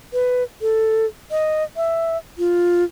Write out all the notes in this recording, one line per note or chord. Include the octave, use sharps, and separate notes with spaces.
B4
A4
D#5
E5
F4